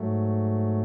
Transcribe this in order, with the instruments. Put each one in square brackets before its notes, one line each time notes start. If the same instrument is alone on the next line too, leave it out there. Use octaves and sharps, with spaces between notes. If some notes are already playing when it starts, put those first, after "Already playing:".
Already playing: [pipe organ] G#2 F#3 A3